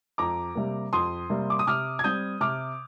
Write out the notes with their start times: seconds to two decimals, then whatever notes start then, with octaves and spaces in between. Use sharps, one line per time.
0.18 F2 A#5 D6
0.55 C3 G3 A#3
0.93 F2 C6 D#6
1.30 C3 G3 A#3
1.50 D6
1.59 D#6
1.67 C3 D6 F6
1.99 G#6
2.04 G3 C4 D#6 G6
2.41 C3 D6 F6